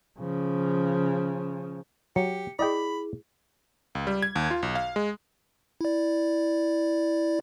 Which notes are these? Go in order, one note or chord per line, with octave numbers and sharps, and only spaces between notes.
C#3 F3
F#3 G4 C#7
E4 G#4 D5 D#5 G5 B5
C#2
G3
G#6
D#2
F4
B1
F5
G#3
E4 D5